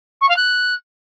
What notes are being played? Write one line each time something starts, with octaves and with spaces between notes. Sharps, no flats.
C#6
F5
F#6